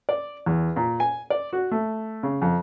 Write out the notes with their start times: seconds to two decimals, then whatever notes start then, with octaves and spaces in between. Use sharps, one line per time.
0.09 D5
0.46 E2
0.76 A#2
1.00 G#5
1.30 D5
1.53 F#4
1.71 A3
2.23 C#3
2.42 F2